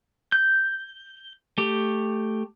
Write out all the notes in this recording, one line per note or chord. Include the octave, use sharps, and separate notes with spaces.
G6
A3 G4